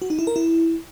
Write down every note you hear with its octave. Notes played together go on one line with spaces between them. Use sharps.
F#4
D#4
E4
A#4
E4